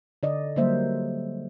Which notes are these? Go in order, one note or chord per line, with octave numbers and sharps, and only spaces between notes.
D3 D5 D#5
D3 F#3 G3 A#3 C5 E5